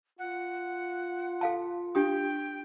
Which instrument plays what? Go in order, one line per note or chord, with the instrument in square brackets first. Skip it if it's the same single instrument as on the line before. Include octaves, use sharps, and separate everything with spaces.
[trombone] F4 [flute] F#5
[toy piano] A4 F5 A5
[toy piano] D4 G4 D#6 [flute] G5